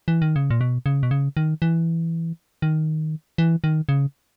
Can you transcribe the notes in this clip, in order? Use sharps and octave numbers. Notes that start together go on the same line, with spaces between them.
E3
D#3
C#3
A#2
B2
C#3
B2
C#3
D#3
E3
D#3
E3
D#3
C#3